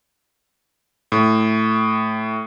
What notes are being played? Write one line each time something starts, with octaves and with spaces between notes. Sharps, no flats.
A2